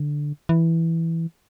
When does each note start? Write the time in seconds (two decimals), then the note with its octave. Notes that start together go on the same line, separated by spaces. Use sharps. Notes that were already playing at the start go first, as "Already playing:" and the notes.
Already playing: D3
0.49 E3